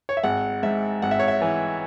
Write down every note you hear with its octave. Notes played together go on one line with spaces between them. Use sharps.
C#5
E5
G#1 F#5
G#2 E5
G#1 F#5
E5
C#5
E5
E3